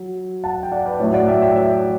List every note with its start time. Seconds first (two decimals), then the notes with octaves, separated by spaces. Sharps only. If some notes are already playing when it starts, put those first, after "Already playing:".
Already playing: F#3
0.44 F#5 A5
0.63 G5
0.72 D5 F#5
0.86 B4 D5
0.99 A2 F#3 C#5 E5
1.14 D5 F#5
1.28 E5 G5
1.42 E5 G5
1.56 C#5 E5